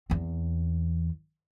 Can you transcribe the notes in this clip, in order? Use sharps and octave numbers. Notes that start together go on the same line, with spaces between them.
E2 C4